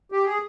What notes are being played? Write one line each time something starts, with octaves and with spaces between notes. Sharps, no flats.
G4
G#4